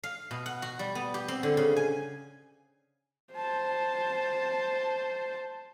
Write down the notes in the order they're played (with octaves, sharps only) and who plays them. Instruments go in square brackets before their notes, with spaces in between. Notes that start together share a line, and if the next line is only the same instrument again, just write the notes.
[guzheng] F5
B2
F#5
F#4
G3
B3
G4
C4
D3
C#3
G#5
[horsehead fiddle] C5 A5